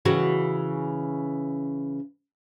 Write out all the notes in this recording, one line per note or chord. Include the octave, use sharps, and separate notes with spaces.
C#3 E3 F#4